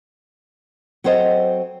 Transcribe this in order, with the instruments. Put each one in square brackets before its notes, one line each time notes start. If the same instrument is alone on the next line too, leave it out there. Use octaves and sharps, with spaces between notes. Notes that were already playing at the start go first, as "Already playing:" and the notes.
[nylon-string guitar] F#3 C4 A4 C5 C#5 D#5